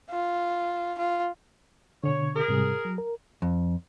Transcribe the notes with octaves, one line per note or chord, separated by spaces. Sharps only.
F4
F4
B2 D3 C#5
G#4 A#4
G#2 C3 G3
F#3
A#4
F2